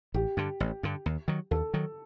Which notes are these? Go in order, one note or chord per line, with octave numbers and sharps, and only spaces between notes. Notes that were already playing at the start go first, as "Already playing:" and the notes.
A1 G4
G2 D3
A1
G2 D3
D#2
D#3 F#3
D#2 A4
D#3 F#3